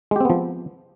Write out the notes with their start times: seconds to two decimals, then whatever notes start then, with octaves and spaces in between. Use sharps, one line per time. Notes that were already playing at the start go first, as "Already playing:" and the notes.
0.11 G#3
0.16 G4
0.20 C4
0.25 B3
0.30 F3